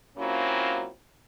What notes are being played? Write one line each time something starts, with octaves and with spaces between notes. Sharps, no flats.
F#3 A#3 C4 C#4 E4 F4